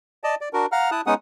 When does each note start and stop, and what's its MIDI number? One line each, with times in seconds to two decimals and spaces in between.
0.24 0.35 74
0.24 0.35 75
0.24 0.35 81
0.41 0.49 74
0.53 0.66 62
0.53 0.66 66
0.53 0.66 70
0.72 0.90 77
0.72 0.90 78
0.72 0.90 82
0.72 0.90 89
0.91 1.01 64
0.91 1.01 81
0.91 1.01 87
0.91 1.01 90
1.06 1.14 56
1.06 1.14 59
1.06 1.14 61
1.06 1.14 63
1.06 1.14 78
1.06 1.14 87